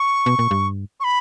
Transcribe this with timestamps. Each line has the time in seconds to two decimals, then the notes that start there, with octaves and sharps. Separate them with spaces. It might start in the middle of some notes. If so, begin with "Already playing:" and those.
Already playing: C#6
0.26 B2
0.39 A#2
0.51 G2
1.00 C#6
1.04 B5